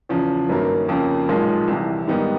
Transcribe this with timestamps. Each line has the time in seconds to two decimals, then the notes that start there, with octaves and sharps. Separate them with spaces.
0.09 E2 C#3 F3
0.49 G1 F#2 D#3 F#3 A#3
0.89 F2 C#3 F3 A#3
1.29 B1 A#2 F3 G#3
1.68 C2 C3 E3
2.08 G#2 D#3 G3 B3 D#4